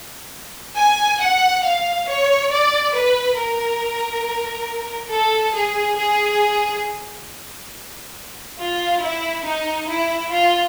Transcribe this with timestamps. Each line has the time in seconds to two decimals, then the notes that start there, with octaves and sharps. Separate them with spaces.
0.76 G#5
1.20 F#5
1.64 F5
2.07 C#5
2.50 D5
2.94 B4
3.37 A#4
5.11 A4
5.55 G#4
5.98 G#4
8.59 F4
9.02 E4
9.46 D#4
9.90 E4
10.33 F4